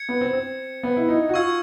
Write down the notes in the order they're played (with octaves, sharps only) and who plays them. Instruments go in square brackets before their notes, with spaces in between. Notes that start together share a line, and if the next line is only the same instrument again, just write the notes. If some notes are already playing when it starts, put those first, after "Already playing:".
Already playing: [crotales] G#6 C#7
[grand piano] B3
C4
C4
B3
E4
D#4
F#4
[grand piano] F4 [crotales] C#6 E6 G#6